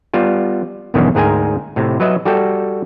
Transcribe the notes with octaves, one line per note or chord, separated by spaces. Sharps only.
G3 B3 F4
B1 E2 G2 D#3 E3 C#4
D2 G#2 G#4 A#4 G5 G#5
A2 C3
F#3 B4 D#5 E5
G3 F#4 A4 G5